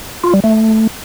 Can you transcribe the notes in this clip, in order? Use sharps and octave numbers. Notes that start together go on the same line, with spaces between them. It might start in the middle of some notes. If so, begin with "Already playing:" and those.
F4
G3
A3